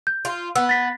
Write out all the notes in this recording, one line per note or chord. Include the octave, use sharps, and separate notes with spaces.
G6
F4
B3 E6
A6 B6